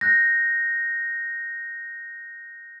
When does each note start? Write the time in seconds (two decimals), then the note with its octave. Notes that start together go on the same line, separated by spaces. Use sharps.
0.01 F#6 G6 A#6